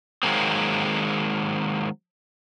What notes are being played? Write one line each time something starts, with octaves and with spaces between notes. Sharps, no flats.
D#3 F#3 G#3 A#3 C4